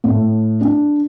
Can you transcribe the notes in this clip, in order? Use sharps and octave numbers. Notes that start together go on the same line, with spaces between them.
A2
D4